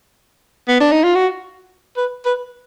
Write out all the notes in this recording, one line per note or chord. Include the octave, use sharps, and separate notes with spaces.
B3
D4
D#4
F4
F#4
B4
B4